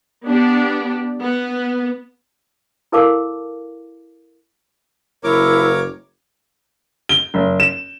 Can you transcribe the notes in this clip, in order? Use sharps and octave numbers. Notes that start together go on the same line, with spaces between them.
B3 D4 G4
B3
E4 A4 A#4 F5 A5 D6
F#1 E4 A#4 C#5 D6
G7
F#1
E7